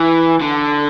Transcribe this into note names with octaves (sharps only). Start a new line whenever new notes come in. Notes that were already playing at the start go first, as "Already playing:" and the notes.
Already playing: E3
D3